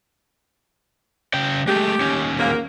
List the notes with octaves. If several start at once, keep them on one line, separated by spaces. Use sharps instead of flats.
C#3 G5
G#3 A3 G4
D#2 C#4
G#2 F#3 A#3